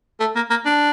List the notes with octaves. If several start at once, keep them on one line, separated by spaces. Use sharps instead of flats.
A3
A#3
A#3
D4